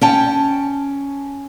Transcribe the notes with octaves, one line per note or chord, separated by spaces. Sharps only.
C#4 G5 A5